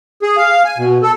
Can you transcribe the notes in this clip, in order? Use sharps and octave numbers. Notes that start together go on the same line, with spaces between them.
G#4
F5
G#5
B2
A4